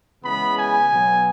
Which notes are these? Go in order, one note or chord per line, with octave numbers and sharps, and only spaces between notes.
C#3 E3 G#3 B3 B5
G#5
B2 F#3 B3